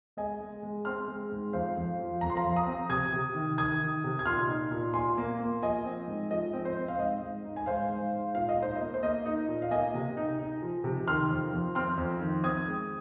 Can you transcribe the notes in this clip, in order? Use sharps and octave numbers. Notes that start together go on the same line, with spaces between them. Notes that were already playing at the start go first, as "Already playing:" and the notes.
G#3 D#5 G#5
G#3
G#3
C4 C6 F6
G#3
G#2
F2 C5 F5
F2
F3
F2 A#5
C6
F5 A#5
F2
A#5 D#6
C4
C3 D#6 G#6
C3
D#3
D#3 D#6 G#6
D#3
C3
G#6
A#2 C6 F6
D#4
A#2
A#2 G#5 C6
A#3
A#3
F3 D#5 G#5
C4
G#2
F3 D#5
C4
C5
C4
F5
G#2 D#5
G#2
D#4
G#5
G#2 C5 F5
G#2
G#2
A#2 F5
D#5
D#4
C5
D#5
A#3
C5
A#3 D#5
D#4
A#2
F5
A#3 D#5 G#5
C3
D#4
D#4
F3
C3
D#3 C6 F6
F2
F2
C4 C6 F6
F2
D#3
C4 D#6 G#6
G#3